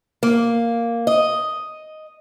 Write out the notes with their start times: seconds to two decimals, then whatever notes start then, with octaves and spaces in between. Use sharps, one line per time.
0.23 A#3
1.07 D#5